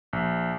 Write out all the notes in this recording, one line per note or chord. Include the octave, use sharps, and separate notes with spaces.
A#1